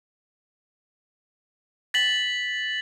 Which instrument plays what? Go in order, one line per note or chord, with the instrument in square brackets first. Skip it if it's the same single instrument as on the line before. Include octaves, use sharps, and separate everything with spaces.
[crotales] A6 B6 F#7